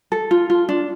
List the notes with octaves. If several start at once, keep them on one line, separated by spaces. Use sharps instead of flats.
A4
F4
F4
D4